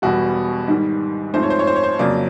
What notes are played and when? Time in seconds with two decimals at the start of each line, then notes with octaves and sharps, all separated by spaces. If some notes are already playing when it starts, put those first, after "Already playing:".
0.02 E1 E2 B2 G3 F#4
0.68 G#2 D#3 G3
1.34 G#2 F3 A3 C4 C5
1.43 C#5
1.50 C5
1.59 C#5
1.67 C5
1.76 C#5
1.83 C5
1.99 F2 C#3 F#3 A#3 D5